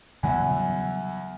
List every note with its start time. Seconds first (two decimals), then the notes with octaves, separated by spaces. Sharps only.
0.23 E2 C#3 F#3 G3 E5 F#5 G#5